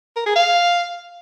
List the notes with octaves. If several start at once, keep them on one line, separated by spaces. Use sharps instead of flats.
A#4
G#4
F5